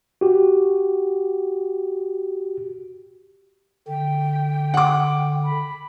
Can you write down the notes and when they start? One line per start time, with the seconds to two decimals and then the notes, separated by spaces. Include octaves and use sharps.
0.21 F#4 G4
3.87 D3 G5
4.74 F#5 D6
5.44 B5